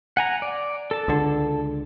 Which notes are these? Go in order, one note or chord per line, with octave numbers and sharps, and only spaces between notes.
F#5 G#5 A#5
D5
A4 A5
C#2 D3